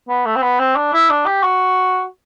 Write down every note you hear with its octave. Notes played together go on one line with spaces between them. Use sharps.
B3
A3
C4
B3
C4
D4
E4
D4
G4
F#4